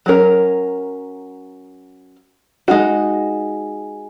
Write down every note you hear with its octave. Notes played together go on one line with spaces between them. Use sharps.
F#3 C#4 A#4
G#3 D#4 F#4